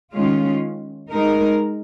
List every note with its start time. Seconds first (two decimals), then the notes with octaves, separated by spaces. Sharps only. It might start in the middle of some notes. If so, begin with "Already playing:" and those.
0.14 D#3 G#3 C#4 F4
1.11 G#3 D#4 A#4